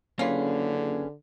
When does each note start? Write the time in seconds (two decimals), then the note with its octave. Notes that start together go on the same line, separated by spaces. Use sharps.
0.19 F#1 D3 A#3 C#4 F4 G#4 B4 C#5